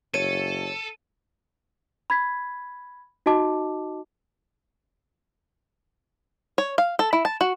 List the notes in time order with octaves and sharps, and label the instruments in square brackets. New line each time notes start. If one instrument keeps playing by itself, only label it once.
[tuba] F#1 [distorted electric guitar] A4 [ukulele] C#5 [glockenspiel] D#7
[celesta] B5 G#6 B6
D#4 F#4 D#5 A5 D6
[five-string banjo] C#5
F5
A4
E4
A5
F#4